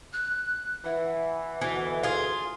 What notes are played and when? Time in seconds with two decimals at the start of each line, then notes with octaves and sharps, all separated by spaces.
0.13 F#6
0.85 E3 F#5
1.61 D2 B2 E3
2.03 F4 G#4 C6